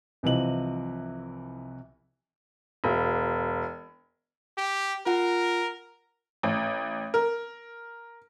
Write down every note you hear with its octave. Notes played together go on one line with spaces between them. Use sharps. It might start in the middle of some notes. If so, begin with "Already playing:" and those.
C2 C3 E3 F3 D#5 F#7
E1
G4
F4 A#4 F#5
A1
A#4